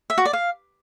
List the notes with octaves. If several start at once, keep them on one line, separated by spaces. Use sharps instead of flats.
E5
F#4
D5
F5